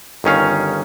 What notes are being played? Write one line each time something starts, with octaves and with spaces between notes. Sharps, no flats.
G1 D#3 C#4 F5